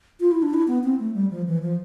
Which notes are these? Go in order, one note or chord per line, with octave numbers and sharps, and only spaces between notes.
F4
E4
D4
E4
B3
C4
A3
G3
F3
E3
F3